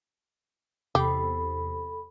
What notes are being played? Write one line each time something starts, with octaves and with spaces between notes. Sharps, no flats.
E2 C3 G4 A4 B5